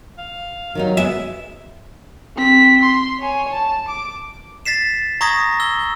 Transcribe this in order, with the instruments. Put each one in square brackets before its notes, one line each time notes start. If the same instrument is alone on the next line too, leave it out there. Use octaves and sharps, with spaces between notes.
[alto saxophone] F5
[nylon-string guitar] D#3 G3 D#4 [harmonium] F#3
[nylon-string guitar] G#3 B3 G#4 [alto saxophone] B4 [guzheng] E5
[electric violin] C4 B6
C6
C#5 G#5
A5
D6
[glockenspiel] A6 B6 C7 E7
A#5 C#6 D#6 G#6 A#6
E6 G7